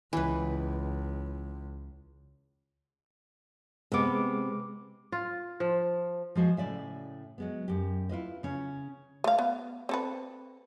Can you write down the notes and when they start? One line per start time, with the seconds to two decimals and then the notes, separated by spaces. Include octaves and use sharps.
0.13 C#2 E3 B4
3.92 C3 G#3 B3 D6
5.12 F4
5.60 F3
6.35 F3 G#3 F#4 C5
6.57 A2 C#3 D5 E5 G#5
7.38 F#3 G#3 B3
7.68 F#2 G4
8.09 E4 F4 B4 D#5
8.43 C#3 C#4
9.24 A3 F5
9.39 B3
9.89 C4 A4 B4